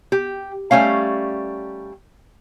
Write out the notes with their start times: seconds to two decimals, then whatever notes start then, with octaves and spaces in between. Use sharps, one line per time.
0.12 G4
0.71 G3 A3 C#4 F5